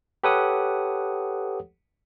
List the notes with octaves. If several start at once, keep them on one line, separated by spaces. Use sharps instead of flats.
G4 A4 B4 C#5 F#5 D#6